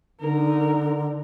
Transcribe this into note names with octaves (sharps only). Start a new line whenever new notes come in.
D3 D#4 A#4